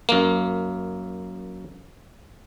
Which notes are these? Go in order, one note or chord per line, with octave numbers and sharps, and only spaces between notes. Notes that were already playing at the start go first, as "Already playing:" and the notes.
F#2 A#3